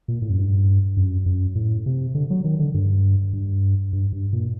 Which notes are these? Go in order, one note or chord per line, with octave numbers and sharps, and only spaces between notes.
A#2
A2
F#2
G2
F#2
F#2
A2
C3
D3
F#3
D#3
D3
G2
G2
G2
G2
A#2